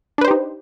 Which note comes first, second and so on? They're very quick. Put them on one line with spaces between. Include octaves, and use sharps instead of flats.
D4 B4 C5 G4 D#4